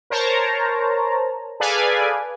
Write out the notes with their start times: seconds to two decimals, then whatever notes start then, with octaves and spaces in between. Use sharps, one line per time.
0.10 A#4 C5 C#5 A5 A#5
1.60 G#4 A4 B4 D5 F5 G#5